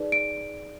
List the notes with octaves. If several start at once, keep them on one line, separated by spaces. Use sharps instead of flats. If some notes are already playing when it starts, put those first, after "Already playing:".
Already playing: D#4 G#4 B4 D5
D7